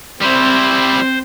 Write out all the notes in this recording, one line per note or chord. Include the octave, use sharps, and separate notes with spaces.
G3 C4 E4 C5